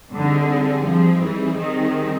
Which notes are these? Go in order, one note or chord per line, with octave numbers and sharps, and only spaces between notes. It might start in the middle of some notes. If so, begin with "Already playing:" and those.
D3 G3 C4 D#4 G#4
F3
E3
D#3